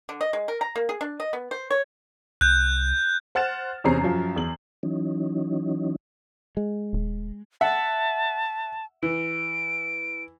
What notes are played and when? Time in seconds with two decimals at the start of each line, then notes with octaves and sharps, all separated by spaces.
0.09 D3
0.21 D#5
0.33 G#3
0.48 A#4
0.61 A#5
0.76 A#3
0.89 G#4
1.01 D4
1.20 D#5
1.33 B3
1.51 C5
1.70 C#5
2.41 C2 F#6 G6
3.35 C5 F#5 F6 A6 E7
3.84 E2 C3 C#4 C5 A#5 C7
4.01 F#2 F3
4.36 E2 F#7
4.83 E3 F#3 C#4 D#4
6.57 G#3
6.93 D#1
7.61 E5 F#5 A5
9.03 E3 D7